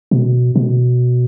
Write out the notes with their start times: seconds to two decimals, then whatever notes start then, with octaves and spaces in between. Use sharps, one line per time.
0.11 B2
0.56 B2